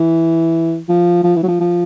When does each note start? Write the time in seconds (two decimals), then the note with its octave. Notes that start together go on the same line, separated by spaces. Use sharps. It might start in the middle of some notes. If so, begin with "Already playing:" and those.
Already playing: E3
0.89 F3
1.24 F3
1.36 E3
1.43 F#3
1.48 F3
1.60 F3